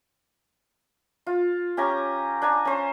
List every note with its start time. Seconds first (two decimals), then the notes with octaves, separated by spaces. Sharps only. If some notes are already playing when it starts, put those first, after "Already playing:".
1.26 F4
1.77 C#4 G4 G#5 A#5
2.42 D4 G#5 A#5
2.65 C#4 C5